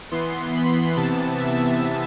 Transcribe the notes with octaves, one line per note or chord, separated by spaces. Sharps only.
E3 B3 C6
B5
C3 E3 B3 A5
E5